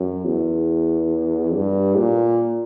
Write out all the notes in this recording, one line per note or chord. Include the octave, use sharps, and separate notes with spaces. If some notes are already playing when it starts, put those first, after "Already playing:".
Already playing: F#2
E2
G2
A#2